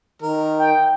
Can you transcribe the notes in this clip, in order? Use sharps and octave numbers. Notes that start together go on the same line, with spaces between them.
D#3 A#4
G5